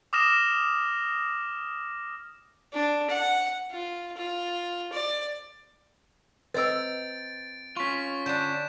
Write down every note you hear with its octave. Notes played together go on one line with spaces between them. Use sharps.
D6 D#6 F6 A#6 E7
D4
F#5
F4
F4
D5
C4 B4 D#5 A#5 E6 A6 D7
C#4 F4 C#6 B6
D3 D4 G6 E7